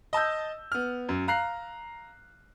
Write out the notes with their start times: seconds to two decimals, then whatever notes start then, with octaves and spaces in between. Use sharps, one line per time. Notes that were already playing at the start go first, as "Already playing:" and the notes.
0.13 D#5 A5 E6 G6
0.72 B3 F6
1.09 F#2
1.28 F5 A#5 F#6 C7